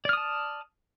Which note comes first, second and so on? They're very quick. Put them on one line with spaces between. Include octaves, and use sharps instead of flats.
D5 F6 D#6 A5